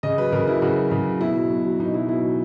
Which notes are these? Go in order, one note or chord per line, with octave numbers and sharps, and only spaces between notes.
C#3 D#5
F#3 B4
C#3 A#4
F#3 E4
C#3 F#4
F#3
C#3
F#3
B2 E4
F#3
B2
F#3
B2 D#4
F#3 E4
B2 E4
F#3